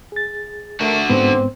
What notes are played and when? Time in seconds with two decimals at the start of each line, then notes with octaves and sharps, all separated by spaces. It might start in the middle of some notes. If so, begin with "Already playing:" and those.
0.12 G#4 A6
0.81 D3 A3 F#4 A#4
1.10 G#2 B3 C4